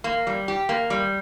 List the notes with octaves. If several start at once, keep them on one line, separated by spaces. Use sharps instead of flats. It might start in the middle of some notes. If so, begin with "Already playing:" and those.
A#3
G3
G4
A#3
G3